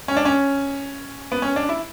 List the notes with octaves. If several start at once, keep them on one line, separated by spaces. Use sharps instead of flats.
C#4
D4
C#4
B3
C#4
D4
E4